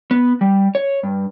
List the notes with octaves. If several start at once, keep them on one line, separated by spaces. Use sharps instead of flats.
B3
G3
C#5
G2